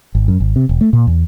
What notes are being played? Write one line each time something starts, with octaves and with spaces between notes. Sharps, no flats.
G#1
F#2
G#1
C3
E1
A3
A#2
E2